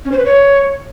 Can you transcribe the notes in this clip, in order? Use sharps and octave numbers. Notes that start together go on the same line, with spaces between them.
C#4
C5
B4
C#5